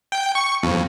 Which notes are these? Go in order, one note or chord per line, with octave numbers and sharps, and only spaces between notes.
G5
C#6
F2